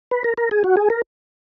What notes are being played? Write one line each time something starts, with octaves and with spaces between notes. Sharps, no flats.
B4
A#4
A#4
G#4
F#4
G#4
A#4